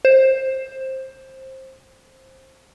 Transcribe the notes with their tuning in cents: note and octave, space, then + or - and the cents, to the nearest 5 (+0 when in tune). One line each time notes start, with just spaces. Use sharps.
C5 +15